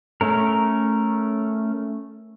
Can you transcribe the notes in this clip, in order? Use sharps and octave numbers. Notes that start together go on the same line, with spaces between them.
A3 C#4 A#4